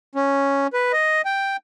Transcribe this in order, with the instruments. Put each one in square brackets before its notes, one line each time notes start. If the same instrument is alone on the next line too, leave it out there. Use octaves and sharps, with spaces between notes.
[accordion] C#4
B4
D#5
G5